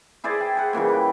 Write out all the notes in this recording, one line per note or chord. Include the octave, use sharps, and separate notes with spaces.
E4 G#4 C5 D5
G5
G#4 C5 F#5
A#2 C#3 E3 G3
B4 G5